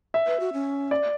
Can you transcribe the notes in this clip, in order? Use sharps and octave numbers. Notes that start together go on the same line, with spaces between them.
E5
B4
F#4
C#4
D5